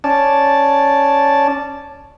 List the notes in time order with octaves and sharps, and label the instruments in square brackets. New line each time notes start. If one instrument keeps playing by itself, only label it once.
[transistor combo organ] C#4 D5 A5